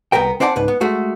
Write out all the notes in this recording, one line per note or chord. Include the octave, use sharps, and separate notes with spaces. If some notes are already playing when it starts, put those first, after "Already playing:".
C2 G#2 B3 A#4 G5
C4 C5 D5 F#5 G5 A5
C#2 G#2 B4
B3
G#3 A3 F#4